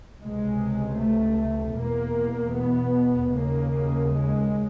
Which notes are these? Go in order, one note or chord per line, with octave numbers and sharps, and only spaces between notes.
C#2 C3 G#3
A3
E2 B2 A#3
B3
D#2 C#3 A#3
G#3